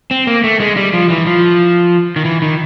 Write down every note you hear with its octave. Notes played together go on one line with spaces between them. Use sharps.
C4
A#3
A3
G#3
G3
F3
E3
F3
D#3
E3
D#3